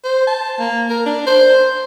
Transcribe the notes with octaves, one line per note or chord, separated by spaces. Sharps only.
C5
A5
A#3
A#4
D4
C5